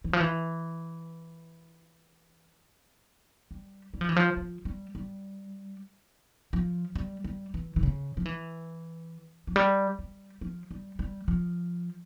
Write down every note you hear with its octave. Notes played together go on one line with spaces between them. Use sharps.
E3
F3
E3
G3
G3
F3
E3
F3
F3
G3
G3
F3
G3
G3
E3
E3
C#3
F3
E3
F3
G3
G3
F3
G3
G3
F3